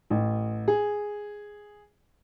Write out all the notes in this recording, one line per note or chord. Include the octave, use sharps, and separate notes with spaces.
A1
G#4